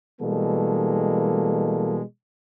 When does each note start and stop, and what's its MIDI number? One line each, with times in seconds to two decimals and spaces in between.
0.21 2.01 47
0.21 2.01 52
0.21 2.01 55
0.21 2.01 56
0.21 2.01 58
0.21 2.01 69